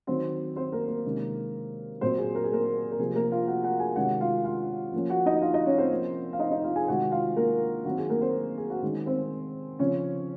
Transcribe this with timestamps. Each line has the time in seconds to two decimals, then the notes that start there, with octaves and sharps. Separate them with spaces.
0.07 D#3 F#3 C4 C5
0.56 C4 C5
0.72 A#3 A#4
0.88 A#3 A#4
1.05 C3 D#3 G#3 C#4
2.01 A#2 F#3 C4 C5
2.18 G#4
2.35 A#4
2.44 G#4
2.52 A#3 A#4
2.92 A#4
2.99 C3 F3 A#3 G#4
3.15 A#3 A#4
3.32 F4 F5
3.47 F#4 F#5
3.64 F#4 F#5
3.80 G#4 G#5
3.96 C3 D#3 G#3 C#4 F#4 F#5
4.20 F4 F5
4.44 F4 F5
4.93 F3 A#3 C#4
5.10 F#4 F#5
5.26 D#4 D#5
5.42 F4 F5
5.54 D#4 D#5
5.66 C#4 C#5
5.78 C4 C5
5.91 F3 A#3 C#4
6.33 F5
6.39 D#4 D#5
6.51 D#4 D#5
6.64 F4 F5
6.76 G#4 G#5
6.88 C3 D#3 G#3 F#4 F#5
7.12 F4 F5
7.36 A#3 A#4
7.85 D#3 F#3 C4 F#4
7.98 G#4
8.09 A#3 A#4
8.21 C4 C5
8.58 G#4
8.70 F#4
8.82 D#3 G#3 C#4 G#4
9.06 C4 C5
9.79 C#3 F3 C4 C#4 C#5